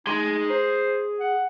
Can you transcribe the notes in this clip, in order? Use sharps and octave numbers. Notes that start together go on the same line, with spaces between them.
D#4 G#4 C6
C5
F#5